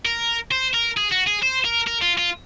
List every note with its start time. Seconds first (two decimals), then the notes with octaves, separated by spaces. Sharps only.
0.05 A#4
0.51 C5
0.74 A#4
0.97 G#4
1.11 F#4
1.27 G#4
1.42 C5
1.65 A#4
1.87 A#4
2.02 F4
2.18 F4